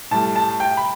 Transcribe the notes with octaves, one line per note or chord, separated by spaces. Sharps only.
A2 G3 A5
A5
G5
B5